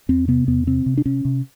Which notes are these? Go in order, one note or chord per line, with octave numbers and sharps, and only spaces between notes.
E2 C4
C3 B3
E2 B3
C3 C4
C3
D4
C3 C#4
C3